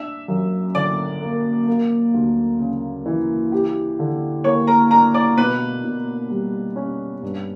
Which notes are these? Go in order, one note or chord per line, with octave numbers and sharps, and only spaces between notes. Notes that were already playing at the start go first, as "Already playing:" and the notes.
Already playing: D4 E5 E6
F#2
D3 D5 D6
A#3
A#3
D2
C#3
E3
G4
D3
A#3 C#5 C#6
A#4 A#5
D4 A#4 A#5
D5 D6
B2 B4 B5
B2
G3
C#4
G2